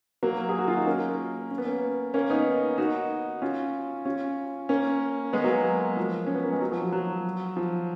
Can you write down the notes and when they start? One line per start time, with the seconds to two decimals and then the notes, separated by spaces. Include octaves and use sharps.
0.23 F#3 A#3
0.49 G#4
0.59 F#4
0.68 F4
0.77 D#4
0.87 A#3 C#4
1.51 C#4
1.58 B3
1.65 A#3 C#4
2.14 A#3 C#4
2.30 B3 D#4
2.78 D#4 F#4
3.42 C#4 F4
4.05 C#4 F4
4.69 A#3 C#4
5.33 G#3 B3
5.44 F#3 A#3
5.97 F3
6.27 C#4
6.35 B3
6.43 A#3
6.52 G#3
6.60 F#3
6.71 F3
6.82 F#3
6.92 F#3
7.57 F3